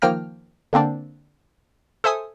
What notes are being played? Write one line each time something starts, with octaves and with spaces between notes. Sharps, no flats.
D#3 F3 A#3 G5 F6 A#6
D3 A#3 C4 D4
A4 C5 E5 G#5 D#6